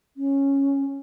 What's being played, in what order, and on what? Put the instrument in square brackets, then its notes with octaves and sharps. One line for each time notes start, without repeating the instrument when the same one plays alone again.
[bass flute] C#4